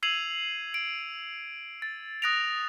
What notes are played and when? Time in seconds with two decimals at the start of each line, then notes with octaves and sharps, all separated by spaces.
0.03 E6 G#6 C7 D#7 F7 F#7
0.74 D7
1.82 A6
2.22 D#6 F#6 A#6 D7 F7